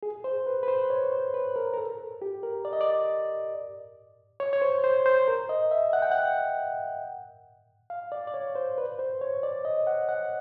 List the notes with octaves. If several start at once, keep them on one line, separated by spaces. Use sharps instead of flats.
G#4
C5
B4
B4
C5
C#5
C5
B4
A#4
A#4
A4
G4
A#4
D5
D#5
D5
C#5
C#5
C5
C5
C5
A#4
D#5
E5
F#5
G5
F#5
F5
D5
D5
C#5
C5
B4
C5
C#5
D5
D#5
F#5
F#5